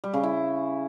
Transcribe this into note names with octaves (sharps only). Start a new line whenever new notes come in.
G3
C#3
E4